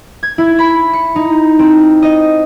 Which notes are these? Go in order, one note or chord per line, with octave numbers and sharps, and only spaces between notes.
G#6
E4
B5
C#7
D#4
C4
D#5